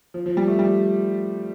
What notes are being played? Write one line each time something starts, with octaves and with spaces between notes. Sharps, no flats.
F3
F3
G3
A3
G3